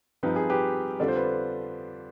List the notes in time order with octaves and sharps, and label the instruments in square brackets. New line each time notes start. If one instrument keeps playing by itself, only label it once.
[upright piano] G2 F3 C4 D#4 [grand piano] B4
[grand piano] G#4
G4 B4
[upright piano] F2 D3 G3 D4 F4 [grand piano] D5
[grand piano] C5
B4